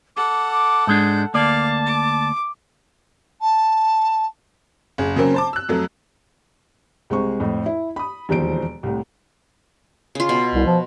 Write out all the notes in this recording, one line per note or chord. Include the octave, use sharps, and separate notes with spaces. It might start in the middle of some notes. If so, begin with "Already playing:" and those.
A4 F#5 D6
D6
G#2 G#3 D4 G6
D2 A#3 D5 F5 A5
D6
A5
F#1 G#4
C#3 F#3 A#3 C4 C#4
C5 A5 D6
E6 F#6
F2 F#3 A3
C2 G#3 C4 C#6
F2 A2
E4
B5 D#6
E1 D#2 F3 C5 D7
C2 A2
C#3 F4
B2
C2
F3